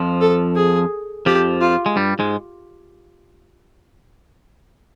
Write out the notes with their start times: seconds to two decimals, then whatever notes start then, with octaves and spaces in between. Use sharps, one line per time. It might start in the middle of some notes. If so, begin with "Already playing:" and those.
Already playing: F2 F3
0.21 A4
0.56 G#4
1.26 F2 F3 G4
1.61 F4
1.86 G#3
1.96 G2 G3
2.19 G#2 G#3